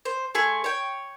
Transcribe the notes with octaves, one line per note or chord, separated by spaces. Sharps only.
C5
A3 G#4 C6
C#5 G5